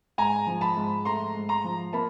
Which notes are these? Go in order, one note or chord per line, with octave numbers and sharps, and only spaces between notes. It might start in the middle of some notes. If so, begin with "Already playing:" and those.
G#2 G#5 A#5
F3
A5 B5
G#2
A3 A#5 C6
G#2
A#5 C6
F3
A#3 A5 B5